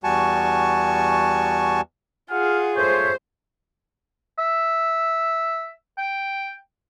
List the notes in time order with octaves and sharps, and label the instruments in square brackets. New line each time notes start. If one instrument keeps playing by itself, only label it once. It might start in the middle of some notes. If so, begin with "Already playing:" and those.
[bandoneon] E2 G3 F#4 G#5 A5 C#6
[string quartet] F4 G#4 [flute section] F#5 [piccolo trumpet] F6
[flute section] A4 E5 G6 [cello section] C5 [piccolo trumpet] C#5
[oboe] E5
G5